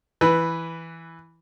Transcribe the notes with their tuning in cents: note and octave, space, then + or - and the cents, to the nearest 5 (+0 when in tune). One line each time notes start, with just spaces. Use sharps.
E3 +0 B4 +0